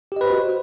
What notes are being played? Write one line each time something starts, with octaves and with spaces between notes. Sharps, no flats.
F#4 G4 B4 C5 D#5